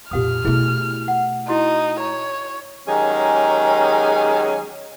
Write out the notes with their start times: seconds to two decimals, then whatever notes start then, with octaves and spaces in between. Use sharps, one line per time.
0.11 F2 A#2 G4 F5 D#6 F6
0.45 B2 A3 E4 G#4 E5
1.08 F#5
1.48 D#4 E4 F#4 C6
2.00 C#5 A#5
2.87 D#3 F#3 G#3 C#4 G4 G#4